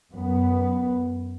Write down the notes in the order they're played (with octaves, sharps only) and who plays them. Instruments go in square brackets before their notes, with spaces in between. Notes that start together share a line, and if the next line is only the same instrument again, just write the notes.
[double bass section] F#2 B3